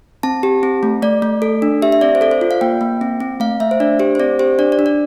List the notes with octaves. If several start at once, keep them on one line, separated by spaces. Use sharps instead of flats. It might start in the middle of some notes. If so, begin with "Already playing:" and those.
C4 A5
G4
C4
A3
A3 D5
A3
A4
D4
G4 E5
E5
C4 D5
C5
A4 D5
C5
F4
F5
A#3 G5
A#3
C4
C4
A3 F5
A3 E5
C5
D4 D5
G4 C5
C5
C4 D5
G4 C5
D4 D5
D5
D4
D5